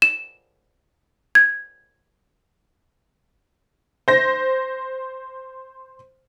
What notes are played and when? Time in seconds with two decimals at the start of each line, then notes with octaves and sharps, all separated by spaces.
0.02 E7
1.35 G#6
4.08 C5 A#6